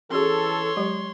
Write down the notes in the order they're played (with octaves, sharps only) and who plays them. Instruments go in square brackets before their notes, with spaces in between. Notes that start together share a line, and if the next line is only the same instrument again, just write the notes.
[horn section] E3 A4 [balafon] C#4 F#4 G#4 [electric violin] C#5 C6
[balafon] F#3 G#3 G4